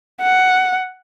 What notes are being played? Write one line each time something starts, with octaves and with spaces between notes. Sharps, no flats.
F#5